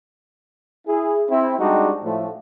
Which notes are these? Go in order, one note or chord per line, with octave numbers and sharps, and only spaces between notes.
E4 G#4
C4 E4
G3 G#3 D4 D#4 F#4 G4
A2 F3 A3